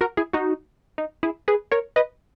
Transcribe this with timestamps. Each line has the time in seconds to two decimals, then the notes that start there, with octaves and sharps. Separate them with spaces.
0.01 F#4 A#4
0.17 E4 G#4
0.33 D#4 F#4
0.98 D#4
1.23 E4 G#4
1.48 G#4 B4
1.71 A#4 C#5
1.96 B4 D#5